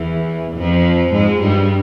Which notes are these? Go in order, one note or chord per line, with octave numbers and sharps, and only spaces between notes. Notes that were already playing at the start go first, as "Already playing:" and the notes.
Already playing: E2 E3
F2 F3
G#2 G#3
G2 G3